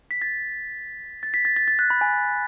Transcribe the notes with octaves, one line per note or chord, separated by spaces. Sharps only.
B6
A6
A6
B6
A6
A6
A6
F#6
B5
G#5